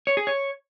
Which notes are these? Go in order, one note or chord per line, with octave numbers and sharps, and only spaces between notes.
C#5
G#4
C#5